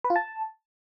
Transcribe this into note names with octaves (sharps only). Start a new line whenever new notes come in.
B4
F4
A5